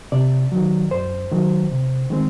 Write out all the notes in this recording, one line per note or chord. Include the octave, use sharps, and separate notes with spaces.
C3 D5
D#3 F#3
F#2 C5
D#3 F#3
C3
D#3 G#3 C4